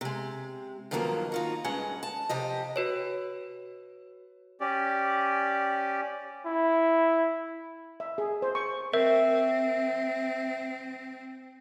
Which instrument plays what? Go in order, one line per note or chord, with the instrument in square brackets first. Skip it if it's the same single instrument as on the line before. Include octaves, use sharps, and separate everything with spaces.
[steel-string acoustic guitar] C3 G#3
G2 D#3 F3 F#3 A3 A#3
D#4 F4 F#4
G2 G#3 C#4 F#5
A5
F2 C3 G4 D#5
[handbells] F#4 B4 C#5
[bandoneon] C#4 G4 D5
[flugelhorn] E4
[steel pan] E5
G#4
C5
C#6
[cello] C4 [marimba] A#4 [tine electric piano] E5